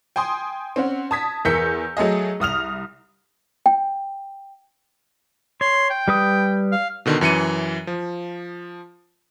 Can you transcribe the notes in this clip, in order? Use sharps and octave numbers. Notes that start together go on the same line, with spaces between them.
G5 G#5 C6 D#6
C4 C#4 F#5
A5 D#6 G#6 B6
E2 A#4 E6 G6 B6 C#7
F#3 A3 G#4 D#5
C2 D#6 F6 F7
G5
C#5 C6
G5
G3 B4 D#6
F5
B2 D3 D#3
F#2 E3 C#7 D#7
F3